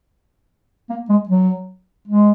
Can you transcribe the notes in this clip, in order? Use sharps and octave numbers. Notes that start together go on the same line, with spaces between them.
A#3
G#3
F#3
G#3